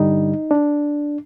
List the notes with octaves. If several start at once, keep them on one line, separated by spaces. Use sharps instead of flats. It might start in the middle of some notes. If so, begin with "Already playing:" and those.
Already playing: G2 D3 G3 D#4
D4